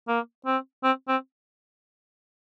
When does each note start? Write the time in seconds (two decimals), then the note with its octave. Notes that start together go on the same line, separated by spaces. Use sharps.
0.08 A#3
0.46 C4
0.84 C4
1.08 C4